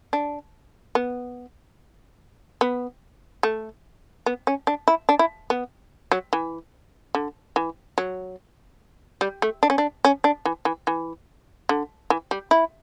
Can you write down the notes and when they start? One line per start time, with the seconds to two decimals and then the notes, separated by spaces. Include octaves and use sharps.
0.13 D4
0.95 B3
2.61 B3
3.43 A3
4.26 B3
4.47 C#4
4.67 D4
4.88 E4
5.09 D4
5.19 E4
5.50 B3
6.12 F#3
6.33 E3
7.15 D3
7.56 E3
7.98 F#3
9.21 G3
9.42 A3
9.63 D4
9.70 C#4
9.78 D4
10.05 C#4
10.24 D4
10.45 E3
10.65 E3
10.87 E3
11.69 D3
12.10 E3
12.31 G3
12.51 E4